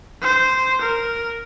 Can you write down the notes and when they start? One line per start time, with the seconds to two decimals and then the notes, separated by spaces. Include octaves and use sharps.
0.22 C5
0.81 A#4